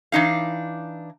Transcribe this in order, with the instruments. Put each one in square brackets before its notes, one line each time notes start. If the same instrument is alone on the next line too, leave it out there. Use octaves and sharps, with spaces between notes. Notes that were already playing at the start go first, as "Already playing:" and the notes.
[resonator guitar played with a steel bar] E3 D4 D#4 F5